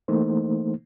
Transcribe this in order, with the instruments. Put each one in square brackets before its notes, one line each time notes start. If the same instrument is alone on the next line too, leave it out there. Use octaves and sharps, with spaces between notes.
[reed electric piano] E3 A3 A#3 D#4 C5